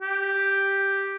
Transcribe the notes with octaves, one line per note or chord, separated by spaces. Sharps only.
G4